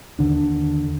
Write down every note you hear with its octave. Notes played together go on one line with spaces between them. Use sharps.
D#2 D3 D4